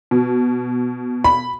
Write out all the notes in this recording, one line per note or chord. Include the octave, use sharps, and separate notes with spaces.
B2
B5